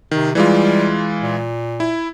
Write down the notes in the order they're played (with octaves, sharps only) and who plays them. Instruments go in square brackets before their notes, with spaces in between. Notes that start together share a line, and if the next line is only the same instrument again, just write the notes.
[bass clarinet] C3 [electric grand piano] D#3
[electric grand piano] E3 G#3 F4 [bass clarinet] G3
[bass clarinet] A#2
[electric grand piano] E4